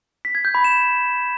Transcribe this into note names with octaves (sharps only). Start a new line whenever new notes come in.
B6
G#6
G6
B5
E7